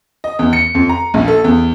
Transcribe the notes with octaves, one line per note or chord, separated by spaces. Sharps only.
D#5
E2
C#7
F2
A#5
A#1
A4
E2